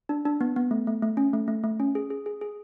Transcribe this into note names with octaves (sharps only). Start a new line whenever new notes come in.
D4
D4
B3
B3
A3
A3
A3
C#4
A3
A3
A3
C#4
G#4
G#4
G#4
G#4